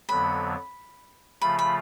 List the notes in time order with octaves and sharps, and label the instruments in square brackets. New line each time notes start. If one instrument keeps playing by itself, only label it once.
[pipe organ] F2 D3 F#3 B3 [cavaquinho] B5
[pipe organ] C#3 F3 A3 F4 [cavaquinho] B5
[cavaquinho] B5